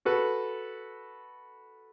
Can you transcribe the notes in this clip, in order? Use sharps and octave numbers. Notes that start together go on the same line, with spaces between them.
F#4 A4 B4